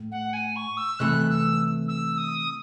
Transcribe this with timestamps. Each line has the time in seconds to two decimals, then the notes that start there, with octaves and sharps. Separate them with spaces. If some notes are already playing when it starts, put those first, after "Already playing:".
Already playing: A2
0.12 F#5
0.33 G#5
0.56 C#6
0.77 E6
0.99 C3 E3 A3 F#6
1.30 E6
1.88 E6
2.18 D#6